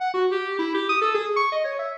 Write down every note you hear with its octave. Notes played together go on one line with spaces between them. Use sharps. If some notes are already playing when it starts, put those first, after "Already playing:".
F#5
F#4
G4
E4
G4
D#6
A4
G#4
C#6
D#5
C#5
E5